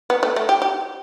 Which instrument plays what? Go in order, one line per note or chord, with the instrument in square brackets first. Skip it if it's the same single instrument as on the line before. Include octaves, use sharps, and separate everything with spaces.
[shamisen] B3
A3
A3
G4
G4